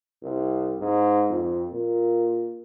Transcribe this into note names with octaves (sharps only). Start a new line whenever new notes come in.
C2
G#2
F2
A#2